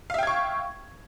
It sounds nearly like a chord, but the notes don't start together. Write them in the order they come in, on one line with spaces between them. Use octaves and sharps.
F5 E5 G5 G#6 C#6